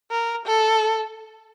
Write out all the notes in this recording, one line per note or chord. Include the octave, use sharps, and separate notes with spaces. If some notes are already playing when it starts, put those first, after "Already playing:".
A#4
A4